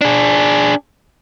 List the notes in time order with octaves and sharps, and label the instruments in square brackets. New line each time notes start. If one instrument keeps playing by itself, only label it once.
[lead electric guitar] D4 G#4